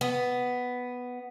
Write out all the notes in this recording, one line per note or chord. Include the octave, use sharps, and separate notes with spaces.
B3